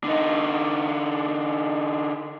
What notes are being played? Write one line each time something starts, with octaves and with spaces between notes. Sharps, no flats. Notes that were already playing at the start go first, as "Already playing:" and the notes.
D3 D#4